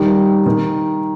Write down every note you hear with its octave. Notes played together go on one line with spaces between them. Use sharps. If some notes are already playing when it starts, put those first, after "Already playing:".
Already playing: D#3 G3
D#3